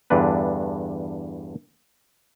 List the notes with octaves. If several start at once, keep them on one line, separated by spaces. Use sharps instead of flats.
E2 G2 D3 D4 B4